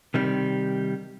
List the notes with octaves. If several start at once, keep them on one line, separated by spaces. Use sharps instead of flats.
C3 D#3 G3